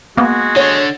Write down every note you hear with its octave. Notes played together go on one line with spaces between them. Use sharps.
G#3 A#3 B3 F#4
D3 C#5